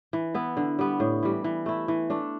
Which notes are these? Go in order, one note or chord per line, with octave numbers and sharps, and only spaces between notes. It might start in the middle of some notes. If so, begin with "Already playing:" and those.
E3
B3 E4
D3
G3 B3
A2
E3 G3
E3
A3 E4
E3
A3 D4